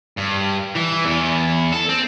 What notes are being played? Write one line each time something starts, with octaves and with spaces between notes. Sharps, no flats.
G2
E3
E2
A4
C4